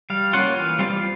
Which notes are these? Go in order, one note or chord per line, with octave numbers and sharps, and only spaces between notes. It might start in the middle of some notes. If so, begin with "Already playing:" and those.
G3 F5
A#3 C#4 F4 F#5
E3 F5
G3 C4 F4